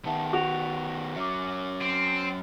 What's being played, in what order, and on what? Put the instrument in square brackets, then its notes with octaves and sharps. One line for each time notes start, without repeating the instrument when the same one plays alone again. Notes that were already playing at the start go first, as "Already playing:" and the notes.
[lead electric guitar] D#3 B3 [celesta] E5 F#5 A5
[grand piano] F#4 [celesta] D7 F7
[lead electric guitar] F#3 C#4 [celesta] E5 D6
[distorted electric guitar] C4